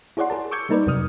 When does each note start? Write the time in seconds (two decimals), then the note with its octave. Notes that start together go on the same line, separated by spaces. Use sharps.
0.17 E4 G#4 C#5 D5 F#5 C6
0.30 G#4 A#4 A5
0.51 C#6 D6 E6 G6 G#6 C#7
0.69 G3 A#3 D#4 A#4 B4 D5
0.87 F2 C3 F#3 D#6 F6